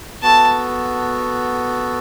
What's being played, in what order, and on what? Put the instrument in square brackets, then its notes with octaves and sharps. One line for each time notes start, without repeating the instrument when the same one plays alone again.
[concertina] B3 F#4 A4 [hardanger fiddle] A5